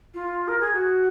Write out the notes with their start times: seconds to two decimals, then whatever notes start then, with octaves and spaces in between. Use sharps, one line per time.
0.14 F4
0.48 A#4
0.60 G#4
0.73 F#4